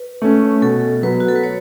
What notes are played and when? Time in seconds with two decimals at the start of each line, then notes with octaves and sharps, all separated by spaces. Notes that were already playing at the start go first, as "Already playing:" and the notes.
Already playing: B4
0.22 A3 C#4
0.62 B2 A4
1.03 F#3 B3 B4
1.20 F#4
1.28 A4
1.36 B4
1.44 C#5